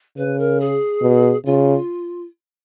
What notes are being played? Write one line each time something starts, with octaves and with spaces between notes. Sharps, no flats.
C#3 B4
A#4
G#4
B2
C#3 F4